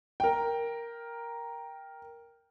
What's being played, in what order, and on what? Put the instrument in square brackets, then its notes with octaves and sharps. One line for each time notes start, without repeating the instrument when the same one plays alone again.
[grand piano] A#4 G5